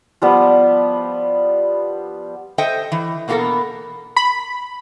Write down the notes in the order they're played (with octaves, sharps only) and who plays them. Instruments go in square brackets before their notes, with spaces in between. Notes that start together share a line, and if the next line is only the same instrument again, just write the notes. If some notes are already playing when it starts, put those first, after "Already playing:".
[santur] F3 G3 B3
[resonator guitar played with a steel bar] A4 C5 D#5 E5 G5
E3
B2 A#3 B3 F#4 A4 A#4
[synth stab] B5